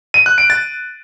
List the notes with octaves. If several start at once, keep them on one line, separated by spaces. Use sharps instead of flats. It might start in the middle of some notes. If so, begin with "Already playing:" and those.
D#7
F#6
D7
A6